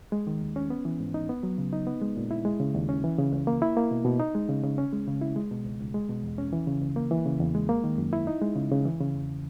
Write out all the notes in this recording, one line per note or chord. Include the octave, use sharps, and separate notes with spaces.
G#3
D#3
D#2
C#4
B3
E3
G#2
D#4
B3
F#3
C#3
D#4
B3
G#3
A#2
E4
G#3
C#3
D#2
C#4
E3
C#3
C#2
A#3
E4
A#3
B2
B2
D#4
G#3
C#3
C#3
C#4
G#3
C#3
E4
G#3
B2
C#2
C#2
G#3
B2
E2
C#4
E3
C#3
C#2
A#3
E3
C#3
E2
G#3
A#3
D#3
F#2
E4
D#4
G#3
C#3
C#3
E3
C#3
E2